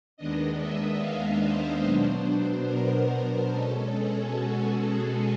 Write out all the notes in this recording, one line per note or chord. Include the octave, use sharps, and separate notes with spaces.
D#2 D#3 G#3 B3 D4 D#5
E5
F5
C5
B2 F#3 B3 D4
A#4
A#4
B2 G#3 C#4 A4
G#4
F#4